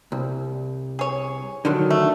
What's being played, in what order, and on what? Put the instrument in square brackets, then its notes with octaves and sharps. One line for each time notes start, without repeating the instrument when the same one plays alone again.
[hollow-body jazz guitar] C2
[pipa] G#4 C#5
[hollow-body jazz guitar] D3 D#3 F#3
[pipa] A3